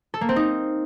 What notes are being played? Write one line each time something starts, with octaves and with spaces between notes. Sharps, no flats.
A4
A#3
C4
D#4